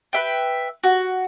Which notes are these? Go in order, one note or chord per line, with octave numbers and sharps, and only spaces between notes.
B4 E5 G5
F#4